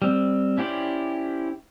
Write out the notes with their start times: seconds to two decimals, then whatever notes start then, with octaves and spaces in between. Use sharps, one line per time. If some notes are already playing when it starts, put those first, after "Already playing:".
0.02 G3 C4
0.58 C#4 E4 G4 C5 D5